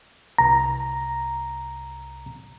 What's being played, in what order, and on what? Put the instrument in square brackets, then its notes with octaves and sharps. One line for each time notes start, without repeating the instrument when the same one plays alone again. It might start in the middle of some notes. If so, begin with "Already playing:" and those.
[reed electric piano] C2 A#5